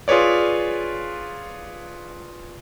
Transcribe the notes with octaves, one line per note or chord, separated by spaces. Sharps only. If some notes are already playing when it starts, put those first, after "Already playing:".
F4 G#4 B4 C#5 D5